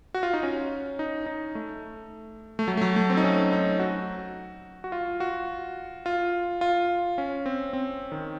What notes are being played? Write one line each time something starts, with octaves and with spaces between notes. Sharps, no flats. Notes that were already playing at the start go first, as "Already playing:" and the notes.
F#4
F4
D#4
C#4
D#4
D#4
A3
A3
F#3
A3
F#3
A3
C4
D#4
C#4
D#4
F#4
F#4
F4
F#4
F4
F4
C#4
C4
C4
D#3